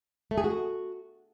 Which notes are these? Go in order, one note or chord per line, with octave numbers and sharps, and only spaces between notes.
A3
G#4
F#4